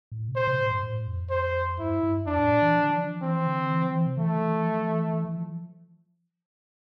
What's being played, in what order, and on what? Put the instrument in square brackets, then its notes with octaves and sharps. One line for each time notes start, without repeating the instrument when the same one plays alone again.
[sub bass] A2
C3
[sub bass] A#2 [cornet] C5
[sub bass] C3
A2
G2
A2
F2
[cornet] C5
[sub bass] G2 [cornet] E4
[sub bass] G2
[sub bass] F2 [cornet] D4
[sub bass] A2
A#2
E3
F3
D3
E3
F3
[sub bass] E3 [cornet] C4
[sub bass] D3
E3
F3
E3
C3
[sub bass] E3 [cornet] A3
[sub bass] E3
F3
E3
E3
E3
F3